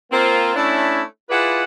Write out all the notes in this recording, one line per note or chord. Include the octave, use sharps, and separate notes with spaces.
A#3 C4 F4
A3 C#4 D4 E4
E4 F4 G#4 B4 D5 F#5